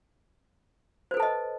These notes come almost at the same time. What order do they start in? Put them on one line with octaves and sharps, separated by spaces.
C5 B4 A4 A5 D#5